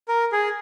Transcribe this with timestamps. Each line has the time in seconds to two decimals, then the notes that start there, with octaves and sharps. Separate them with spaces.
0.08 A#4
0.32 G#4